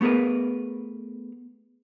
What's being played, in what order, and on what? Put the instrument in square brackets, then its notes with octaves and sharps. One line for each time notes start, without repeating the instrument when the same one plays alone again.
[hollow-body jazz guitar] A3 B3 G#4 A#4 B4